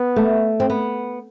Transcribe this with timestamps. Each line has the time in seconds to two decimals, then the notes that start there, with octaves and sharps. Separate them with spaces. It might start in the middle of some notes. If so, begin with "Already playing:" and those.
Already playing: B3
0.16 A3
0.60 C4
0.70 B3